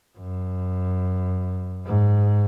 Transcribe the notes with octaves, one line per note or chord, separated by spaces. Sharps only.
F#2
G#2